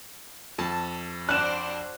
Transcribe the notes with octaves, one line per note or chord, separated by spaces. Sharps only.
F2 A5
D4 F#4 C5 F#6 E7